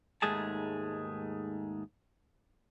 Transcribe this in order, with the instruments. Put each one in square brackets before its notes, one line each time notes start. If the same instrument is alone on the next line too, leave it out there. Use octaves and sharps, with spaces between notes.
[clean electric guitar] D#2 G#2 G#3 A3 G#4 A5